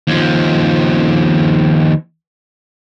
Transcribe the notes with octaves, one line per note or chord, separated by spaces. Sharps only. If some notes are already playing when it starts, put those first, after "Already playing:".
D#2 F3